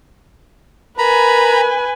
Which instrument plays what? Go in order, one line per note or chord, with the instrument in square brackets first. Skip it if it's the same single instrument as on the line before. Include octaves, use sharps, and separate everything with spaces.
[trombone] A#4 [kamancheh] B4 G#5 [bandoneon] A#5 B5